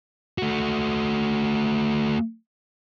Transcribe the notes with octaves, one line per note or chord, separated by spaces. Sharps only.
A3 F#4